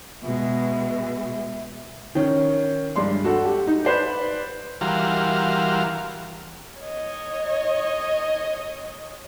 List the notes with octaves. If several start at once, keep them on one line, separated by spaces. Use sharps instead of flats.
B2 G#3 E5
D#3 C#4
G2 G#3 D5 C6
F#4 A4 F#5
G4
D#4
B4 C5 D5
E3 G3 F#4 A#4 F5 C6
C#5 D#5